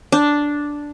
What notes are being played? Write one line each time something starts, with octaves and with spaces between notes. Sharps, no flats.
D4